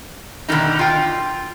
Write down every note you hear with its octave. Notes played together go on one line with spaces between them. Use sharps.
B2 D3 D#3 G3 D#4
F4 G5